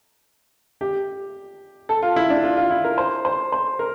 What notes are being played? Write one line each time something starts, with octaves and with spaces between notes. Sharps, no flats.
G4
A4
F4
E4
D4
F4
F4
E4
A#4
C5
C5
C5
A#4